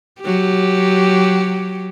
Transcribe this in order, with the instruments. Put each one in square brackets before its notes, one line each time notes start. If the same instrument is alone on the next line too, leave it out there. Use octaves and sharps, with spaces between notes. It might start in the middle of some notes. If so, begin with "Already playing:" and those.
[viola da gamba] F#3 G4